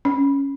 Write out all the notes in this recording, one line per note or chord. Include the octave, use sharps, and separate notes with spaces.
C#4